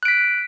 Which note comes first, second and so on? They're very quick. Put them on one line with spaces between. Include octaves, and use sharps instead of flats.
F#6 D7 B6